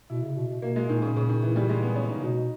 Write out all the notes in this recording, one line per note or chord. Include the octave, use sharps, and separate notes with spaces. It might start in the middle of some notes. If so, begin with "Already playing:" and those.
B2 E4
C#3
B2
B2
B2 A#3
G#3
A#2 D#3
C#3
C#3
D#3
E3
G3
G#3
B3
C#4
D#4
C#3
B2